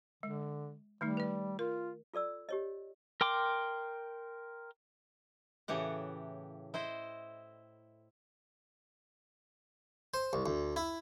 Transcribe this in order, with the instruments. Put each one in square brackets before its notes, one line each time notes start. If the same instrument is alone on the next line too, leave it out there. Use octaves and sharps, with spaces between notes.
[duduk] D3 [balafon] G#3
[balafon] D#3 A3 D#4 [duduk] G3
[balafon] B4 D5
[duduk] F4 [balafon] A#4
[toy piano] F4 A4 D5 E6
G4 C#5 D#5
[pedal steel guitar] A#4 G5 C6 D6
[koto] A2 C#3 E3 G4 F#5
E4 C5 D#5
[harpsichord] C5
C2
D2
E4